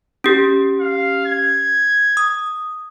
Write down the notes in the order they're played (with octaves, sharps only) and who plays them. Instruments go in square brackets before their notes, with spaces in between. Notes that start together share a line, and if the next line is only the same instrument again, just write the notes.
[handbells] C#4 G4
[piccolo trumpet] F5
G#6
[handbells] D#6